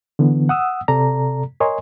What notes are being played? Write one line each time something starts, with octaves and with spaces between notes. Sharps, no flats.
D3 E3 B3
F#5 D#6 E6
C3 A4 D5 A#5
A#4 C#5 D#5 G#5 C6